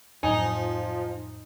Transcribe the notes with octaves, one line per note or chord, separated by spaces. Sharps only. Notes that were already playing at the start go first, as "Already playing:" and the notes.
F2 A2 F3 F#3 D#4 G#5